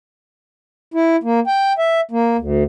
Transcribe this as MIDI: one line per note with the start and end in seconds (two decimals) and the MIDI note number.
0.94 1.16 64
1.23 1.40 58
1.47 1.73 79
1.78 2.01 76
2.11 2.37 58
2.39 2.63 38